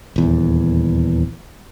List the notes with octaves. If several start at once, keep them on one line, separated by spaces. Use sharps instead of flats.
D#1 E2